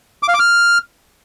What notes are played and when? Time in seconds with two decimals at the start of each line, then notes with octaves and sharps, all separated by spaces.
0.23 D6
0.28 F5
0.34 D6
0.40 F6